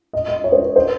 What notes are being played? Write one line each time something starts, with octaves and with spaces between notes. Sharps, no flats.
D#5
D#5
C#5
C5
C#5
C5